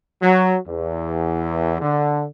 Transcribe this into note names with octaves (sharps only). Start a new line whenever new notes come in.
F#3
E2
D3